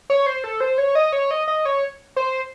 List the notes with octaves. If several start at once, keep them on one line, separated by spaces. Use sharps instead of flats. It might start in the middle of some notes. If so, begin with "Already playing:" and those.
C#5
C5
A4
C5
C#5
D#5
C#5
D#5
D#5
C#5
C5